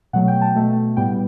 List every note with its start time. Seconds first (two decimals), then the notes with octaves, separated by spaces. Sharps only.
0.13 B2 F#3 A3 F#5
0.28 G5
0.41 A5
0.55 B2 A3
0.97 A2 G3 B3 G5